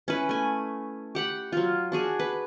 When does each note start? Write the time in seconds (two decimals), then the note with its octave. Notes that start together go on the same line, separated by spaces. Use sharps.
0.08 C#4 E4 B4
0.29 A3 G#5
1.15 G4 F#5 B5
1.52 F#3 F4
1.92 D4 F#4 G#4
2.19 B4